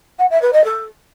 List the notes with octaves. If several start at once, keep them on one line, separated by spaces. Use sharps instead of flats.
F#5
E5
B4
D#5
A4